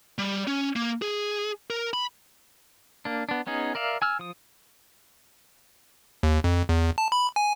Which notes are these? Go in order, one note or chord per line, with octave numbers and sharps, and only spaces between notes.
G3
C#4
A#3
G#4
A#4
B5
A#3 D4
B3 D4
B3 C#4 D#4 G#4
A#4 D5 E5 F5
G#5 E6 F6
F3 D#6
D#2
F2
E2
A5
B5
G#5